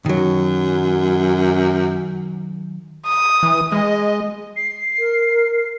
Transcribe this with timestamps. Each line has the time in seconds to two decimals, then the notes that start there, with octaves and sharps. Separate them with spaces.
0.06 F#2 D#3 F#3
3.06 D#6
3.43 E3
3.72 G#3 D#5
4.56 C7
4.99 A#4